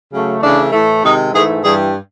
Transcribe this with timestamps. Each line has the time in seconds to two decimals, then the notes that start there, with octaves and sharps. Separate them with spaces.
0.11 C#3 F#3 A3
0.41 C#3 E3 A3 D4
0.72 A2 E3 A3
1.02 C3 D#3 G#3 D#4
1.33 G#2 E3 A3 G#4
1.63 G2 E3 G3 G#4